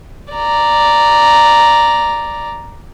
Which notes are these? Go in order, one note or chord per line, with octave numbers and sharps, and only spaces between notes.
D5 A#5